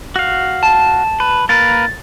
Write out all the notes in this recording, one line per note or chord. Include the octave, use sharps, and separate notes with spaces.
F#4 F5
A5
B4
A#3 A#4 B4 A6